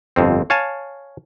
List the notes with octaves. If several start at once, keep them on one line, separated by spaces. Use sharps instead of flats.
G1 F2 C4
C#5 F5 G#5 A5